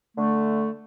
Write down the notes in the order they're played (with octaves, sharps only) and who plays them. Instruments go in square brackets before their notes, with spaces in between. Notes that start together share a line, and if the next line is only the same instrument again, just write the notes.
[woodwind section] D3 A3